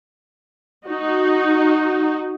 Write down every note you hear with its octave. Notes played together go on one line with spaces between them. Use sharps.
D#4 F#4